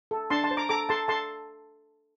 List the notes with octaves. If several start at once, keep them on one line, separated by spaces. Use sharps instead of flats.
A4
D4 A5 C6
A5 C6
C5
A#5 D6
A4 A#5 D6
A4 A5 C6
A4 A5 C6